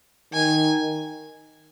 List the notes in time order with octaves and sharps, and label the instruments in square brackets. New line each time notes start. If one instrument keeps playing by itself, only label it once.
[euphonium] D#3 [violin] G#5